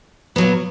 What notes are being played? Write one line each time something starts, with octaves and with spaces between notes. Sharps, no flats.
A#2 F#3 B3